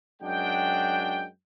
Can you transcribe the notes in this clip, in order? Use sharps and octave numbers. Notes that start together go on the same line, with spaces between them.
F#2 G#3 D4 F#4 G5